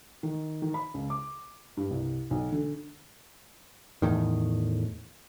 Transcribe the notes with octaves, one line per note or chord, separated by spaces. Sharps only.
D#3
D#3
B5
C#2
D6
G2
C2
B1
D3
E2 A2 D#3